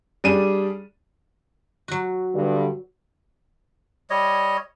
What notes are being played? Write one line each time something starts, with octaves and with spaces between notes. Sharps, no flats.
G3 D4 G#4 D#7 E7
F#3 F#4
G2 D3
G3 C#5 D#5